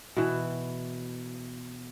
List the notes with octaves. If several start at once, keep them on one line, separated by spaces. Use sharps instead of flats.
B2 E3